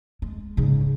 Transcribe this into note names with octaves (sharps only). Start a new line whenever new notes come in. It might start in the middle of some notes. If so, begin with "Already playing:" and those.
G#3
G#2 C#3